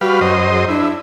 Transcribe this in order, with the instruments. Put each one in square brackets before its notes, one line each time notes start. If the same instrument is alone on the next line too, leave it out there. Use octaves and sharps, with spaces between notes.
[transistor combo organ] G3 B4 F5 [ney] F#4
[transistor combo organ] F#2 C5 D#5
[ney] G#4
[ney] D4 [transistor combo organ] E4